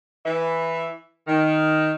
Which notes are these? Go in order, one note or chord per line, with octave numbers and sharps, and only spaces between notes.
E3 E5
D#3